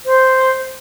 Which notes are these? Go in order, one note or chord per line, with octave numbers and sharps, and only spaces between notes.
C5